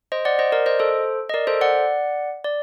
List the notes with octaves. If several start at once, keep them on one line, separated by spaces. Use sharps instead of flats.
C5 D#5
D5 F#5
C5 D#5
A#4 D5
C5 D#5
A4 C5
D#5
A#4 D5
A4 C5
D5 F#5
D5